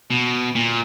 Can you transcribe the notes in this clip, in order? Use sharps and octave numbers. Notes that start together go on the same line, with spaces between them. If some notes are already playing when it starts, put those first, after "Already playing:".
B2
A#2